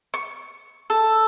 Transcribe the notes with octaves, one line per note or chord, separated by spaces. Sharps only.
C#6
A4